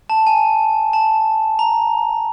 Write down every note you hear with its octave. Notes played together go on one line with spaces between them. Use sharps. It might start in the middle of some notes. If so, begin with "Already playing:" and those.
A5
G#5
A5
A#5